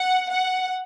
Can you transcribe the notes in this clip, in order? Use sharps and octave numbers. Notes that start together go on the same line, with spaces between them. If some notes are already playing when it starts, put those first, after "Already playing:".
Already playing: F#5
F#5